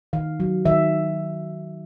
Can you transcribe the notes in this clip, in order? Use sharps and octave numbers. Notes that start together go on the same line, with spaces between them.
D#3 F5
F#3
D#3 E5